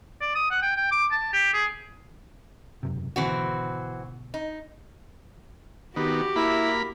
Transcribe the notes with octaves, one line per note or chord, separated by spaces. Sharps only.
D5
D#6
F#5
G5
G5
D6
A5
G4
G#4
E1 F#2 C3
G#1 B2 D3 E3 C4 F#4
D#4
D#3 B3 F#4 G4
A#3 E4 B5